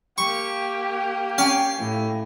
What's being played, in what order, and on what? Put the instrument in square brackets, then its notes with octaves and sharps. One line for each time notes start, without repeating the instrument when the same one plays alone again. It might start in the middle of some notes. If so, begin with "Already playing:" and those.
[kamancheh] A#3 G4 [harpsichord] C#6
[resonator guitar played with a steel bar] C#4 G5 G#5 [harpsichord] F5
[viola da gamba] A2